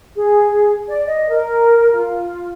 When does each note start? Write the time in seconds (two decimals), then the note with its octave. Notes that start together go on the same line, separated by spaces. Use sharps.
0.17 G#4
0.88 D5
1.07 D#5
1.29 A#4
1.94 F4